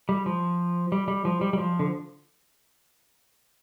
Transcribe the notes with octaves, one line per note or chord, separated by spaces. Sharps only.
G3
F3
G3
G3
F3
G3
G3
F3
D3